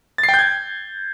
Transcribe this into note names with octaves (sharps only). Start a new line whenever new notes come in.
A6
C7
G5
G6
G#6